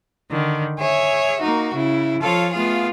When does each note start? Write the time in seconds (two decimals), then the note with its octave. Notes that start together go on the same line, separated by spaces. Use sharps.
0.30 D3 D#3
0.77 G#4 C#5 E5
1.39 A#3 D#4 F#4
1.73 C#3 E4
2.22 F3 F4 A4 C#5 F5
2.52 A3 B3 F4 G#4 F5